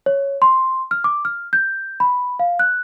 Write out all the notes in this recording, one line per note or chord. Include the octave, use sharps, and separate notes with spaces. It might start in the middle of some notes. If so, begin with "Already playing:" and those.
C#5
C6
F6
D6
F6
G6
B5
F5
F#6